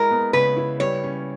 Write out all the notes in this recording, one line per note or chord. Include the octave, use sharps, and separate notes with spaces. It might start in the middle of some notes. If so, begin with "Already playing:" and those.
Already playing: G#3 E4 A#4
B3
C#3 B4
E4
G3 C#5
C#4